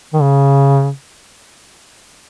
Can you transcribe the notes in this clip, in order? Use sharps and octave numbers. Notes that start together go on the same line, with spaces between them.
D#3
C#3